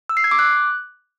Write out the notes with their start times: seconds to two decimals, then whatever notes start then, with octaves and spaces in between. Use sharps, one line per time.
0.09 E6
0.17 C7
0.24 G#6
0.31 D6
0.39 F#6